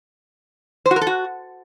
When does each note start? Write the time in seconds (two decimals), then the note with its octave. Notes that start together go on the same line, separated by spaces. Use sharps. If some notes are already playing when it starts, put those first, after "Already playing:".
0.86 C5
0.91 F#4
0.96 A#4
1.01 A4
1.07 F#4